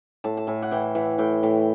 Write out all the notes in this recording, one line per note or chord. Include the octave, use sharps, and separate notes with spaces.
A2 A5
A5
A2 G#5
F#5
E3 G5
E3 F#5
A2 G5
A2